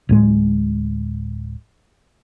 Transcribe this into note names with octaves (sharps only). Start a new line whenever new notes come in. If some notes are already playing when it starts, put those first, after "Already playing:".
D1 A2 G#3